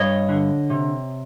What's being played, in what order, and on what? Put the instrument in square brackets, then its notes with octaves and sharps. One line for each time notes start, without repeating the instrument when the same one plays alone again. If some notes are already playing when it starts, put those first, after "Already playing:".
Already playing: [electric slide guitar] G2 C#5 D#5
D3
C3